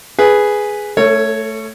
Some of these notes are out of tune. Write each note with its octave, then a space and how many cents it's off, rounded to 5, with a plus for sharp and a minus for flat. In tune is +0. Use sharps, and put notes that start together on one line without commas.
G#4 +0 B4 +0
A3 +0 A4 +45 C#5 +0